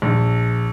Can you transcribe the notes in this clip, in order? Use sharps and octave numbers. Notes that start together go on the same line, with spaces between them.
A#1